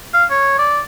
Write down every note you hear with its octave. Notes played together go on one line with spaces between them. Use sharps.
F5
C#5
D5